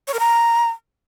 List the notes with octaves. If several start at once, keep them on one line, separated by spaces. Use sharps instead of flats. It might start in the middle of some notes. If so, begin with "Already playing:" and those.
C#5
A#4
A#5